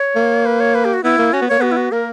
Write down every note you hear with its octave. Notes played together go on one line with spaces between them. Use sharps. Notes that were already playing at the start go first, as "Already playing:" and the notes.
Already playing: C#5
A#3
B4
C#5
B4
G4
F#4
B3 E4
A#3
C#4 F#4
B3
A#3 C#5
B3 F#4
E4
F#4
A#3 A#4